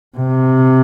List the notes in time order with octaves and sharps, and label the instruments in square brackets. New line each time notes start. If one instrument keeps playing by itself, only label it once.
[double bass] C3